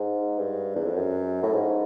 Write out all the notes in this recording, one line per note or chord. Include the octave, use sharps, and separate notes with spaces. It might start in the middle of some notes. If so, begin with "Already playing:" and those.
Already playing: G#2
G2
E2
F2
F#2
A2
G#2